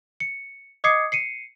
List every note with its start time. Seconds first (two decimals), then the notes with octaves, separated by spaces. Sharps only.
0.20 C#7
0.84 D#5 D6 D#6 G#6 C7 C#7
1.12 C7 C#7 D#7